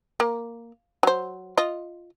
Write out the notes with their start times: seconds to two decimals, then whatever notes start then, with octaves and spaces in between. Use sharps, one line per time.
0.20 A#3
1.03 F#3 C5
1.57 F4 D#5